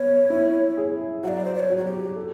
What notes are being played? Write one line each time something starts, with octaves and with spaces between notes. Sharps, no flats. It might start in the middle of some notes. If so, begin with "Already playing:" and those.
Already playing: B3 C#5
E4
G#4
F#3 D5 F#5
C5
D5
C#5
F#3
F#4
G4
A4